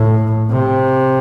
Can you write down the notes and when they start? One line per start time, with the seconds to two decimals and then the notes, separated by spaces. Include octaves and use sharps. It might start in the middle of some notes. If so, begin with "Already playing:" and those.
Already playing: A2
0.50 C3